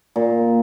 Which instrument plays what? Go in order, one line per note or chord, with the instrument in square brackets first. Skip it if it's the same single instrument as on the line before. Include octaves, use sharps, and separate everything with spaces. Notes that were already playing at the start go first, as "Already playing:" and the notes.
[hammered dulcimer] A#2